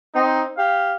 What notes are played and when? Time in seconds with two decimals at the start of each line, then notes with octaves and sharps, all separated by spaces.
0.14 C4 D#4
0.57 G4 F5